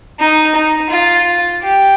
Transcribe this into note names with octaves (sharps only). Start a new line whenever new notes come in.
D#4
D#4
F4
G4